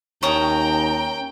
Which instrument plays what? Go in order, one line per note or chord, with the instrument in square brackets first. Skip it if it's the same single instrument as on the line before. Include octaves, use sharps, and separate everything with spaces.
[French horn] D#2 [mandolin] C#4 A5 D#6 [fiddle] G5 [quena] A#5